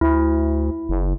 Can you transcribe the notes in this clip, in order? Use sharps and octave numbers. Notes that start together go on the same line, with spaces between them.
D2 E4
F#1